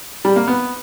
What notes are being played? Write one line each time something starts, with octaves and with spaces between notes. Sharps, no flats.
G3
A#3
B3